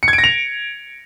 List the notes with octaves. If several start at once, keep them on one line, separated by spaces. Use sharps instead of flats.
C#7
G#6
D7
A#6
F7